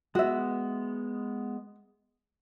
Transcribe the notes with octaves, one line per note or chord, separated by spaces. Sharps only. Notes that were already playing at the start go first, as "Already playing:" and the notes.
G#3 B3 F#4 E5